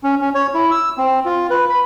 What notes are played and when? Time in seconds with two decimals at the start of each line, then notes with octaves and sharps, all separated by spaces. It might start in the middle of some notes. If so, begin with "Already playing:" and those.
0.04 C#4
0.21 C#4
0.35 C#5
0.54 E4
0.71 E6
0.98 C4
1.25 F4
1.50 B4
1.70 B5